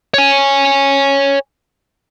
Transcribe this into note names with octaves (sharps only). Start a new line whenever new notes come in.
C#5 G#5